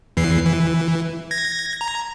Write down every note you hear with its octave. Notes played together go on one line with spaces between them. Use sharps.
E2 E3 C7
E3
G#6 A#6
A#5